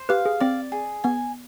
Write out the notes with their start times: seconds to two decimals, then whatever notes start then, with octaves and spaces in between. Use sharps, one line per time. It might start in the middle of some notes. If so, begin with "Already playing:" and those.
Already playing: C5
0.09 G4 B4 F5
0.26 G#4
0.40 C4 D5
0.72 G#4
1.04 B3 G#5